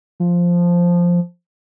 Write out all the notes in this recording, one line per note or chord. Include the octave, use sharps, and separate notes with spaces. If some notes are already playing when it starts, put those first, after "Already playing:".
F3